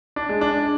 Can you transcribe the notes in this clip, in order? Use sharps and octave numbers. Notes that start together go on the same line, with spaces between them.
D4
G#3
D4